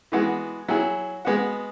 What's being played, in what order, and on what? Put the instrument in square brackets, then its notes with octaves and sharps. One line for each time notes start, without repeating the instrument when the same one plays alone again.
[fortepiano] E3 G#3 B3 F#4
F#3 E4 G#4
G#3 B3 F#4